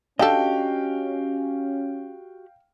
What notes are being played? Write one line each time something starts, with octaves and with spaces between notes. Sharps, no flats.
C#4 D4 F#4 G4 A4 D#5 F5 G5